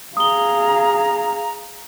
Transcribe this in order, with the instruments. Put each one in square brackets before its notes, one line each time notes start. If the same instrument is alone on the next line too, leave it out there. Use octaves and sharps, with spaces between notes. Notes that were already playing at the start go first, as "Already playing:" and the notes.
[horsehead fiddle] G#4 F5 [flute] A#5 [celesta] D#6 G7